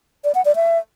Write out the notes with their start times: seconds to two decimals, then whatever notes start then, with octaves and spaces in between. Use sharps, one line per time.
0.24 D5
0.35 F#5
0.45 D5
0.56 E5